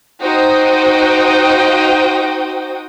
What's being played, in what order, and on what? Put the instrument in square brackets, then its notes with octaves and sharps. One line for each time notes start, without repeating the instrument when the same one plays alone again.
[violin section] D#4 F#4 C5 G5 D#6